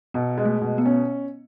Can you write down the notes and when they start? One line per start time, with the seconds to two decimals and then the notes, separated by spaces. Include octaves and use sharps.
0.14 B2 B3
0.38 G#3
0.45 A3
0.61 B2
0.78 B3
0.86 C#4